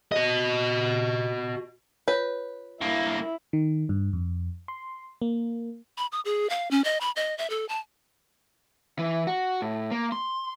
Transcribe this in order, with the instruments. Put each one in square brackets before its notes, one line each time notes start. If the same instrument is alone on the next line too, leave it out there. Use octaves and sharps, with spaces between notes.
[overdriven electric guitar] F#4 D#5
[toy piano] F4 C#5 [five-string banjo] B4
[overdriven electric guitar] G2 A#3 [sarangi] E4
[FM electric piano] D#3
G2
F2
C6
A#3
[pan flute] B5
D#6
G#4
F5
C#4
D#5
B5
D#5
E5
A4
A5
[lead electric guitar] E3
F#4
A2
A#3
C6